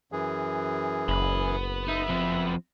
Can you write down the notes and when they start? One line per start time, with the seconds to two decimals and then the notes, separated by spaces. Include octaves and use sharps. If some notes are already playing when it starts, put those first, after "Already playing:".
0.12 F#2 E3 G#4
1.08 F#1 B3 B4
1.88 D#4 E5
2.09 F3 C4